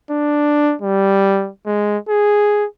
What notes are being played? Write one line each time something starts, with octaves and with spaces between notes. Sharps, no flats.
D4
G3
G#3
G#4